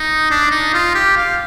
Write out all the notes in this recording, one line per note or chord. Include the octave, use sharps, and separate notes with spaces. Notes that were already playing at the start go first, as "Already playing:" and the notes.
Already playing: D#4
D4
D#4
F4
G4
F5